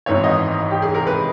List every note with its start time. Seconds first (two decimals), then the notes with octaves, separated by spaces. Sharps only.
0.06 G#1 G#2 E3 C#5
0.24 D#5
0.71 G4
0.82 G#4
0.94 A#4
1.07 B4